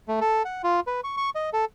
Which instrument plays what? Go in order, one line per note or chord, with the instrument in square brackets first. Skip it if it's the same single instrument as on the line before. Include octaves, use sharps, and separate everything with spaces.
[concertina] A3
A4
F#5
F4
B4
C#6
C#6
D#5
A4